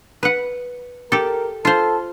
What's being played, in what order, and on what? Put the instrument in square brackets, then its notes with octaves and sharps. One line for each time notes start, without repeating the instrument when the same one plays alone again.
[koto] B4 F#5
[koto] G4 A4 [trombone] A#4
[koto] F4 C5 [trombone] A4